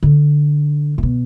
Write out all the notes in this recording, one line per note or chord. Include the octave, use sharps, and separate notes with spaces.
D3
A2
B2